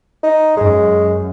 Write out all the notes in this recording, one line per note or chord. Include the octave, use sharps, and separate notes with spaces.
D#4
F#2 G#3